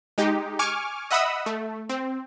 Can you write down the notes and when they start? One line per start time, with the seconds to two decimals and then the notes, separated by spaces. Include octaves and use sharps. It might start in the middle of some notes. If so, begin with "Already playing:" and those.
0.18 G#3 D#4 G4
0.59 G#5 C#6 D6 F6
1.11 D#5 E5 F#5 B5 D#6 E6
1.46 A3
1.89 C4